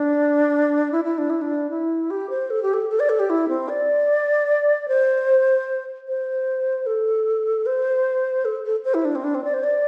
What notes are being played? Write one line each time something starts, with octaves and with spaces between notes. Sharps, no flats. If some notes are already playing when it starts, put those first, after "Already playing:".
Already playing: D4
E4
E4
D4
E4
D4
E4
G4
C5
A4
G4
A4
A4
D5
A4
G4
E4
C4
D5
C5
C5
A4
C5
A4
A4
C5
E4
D4
C4
D4
C4
D5
C5
D5